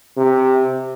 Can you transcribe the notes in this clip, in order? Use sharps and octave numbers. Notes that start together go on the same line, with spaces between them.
C3